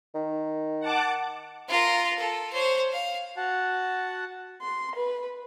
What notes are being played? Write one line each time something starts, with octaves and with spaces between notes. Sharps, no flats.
D#3
F#5 A5 D6
F4 A#4
A4
C5 C#5
F5
F#4 F#5 A5
C6
B4